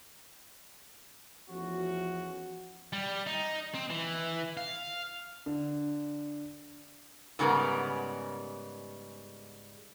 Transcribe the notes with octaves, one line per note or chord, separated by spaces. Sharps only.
E2 F3 A3 C#4 F#4
G3
D#4
C4
E3
F5
D3
G#2 C#3 G3 B3 A#4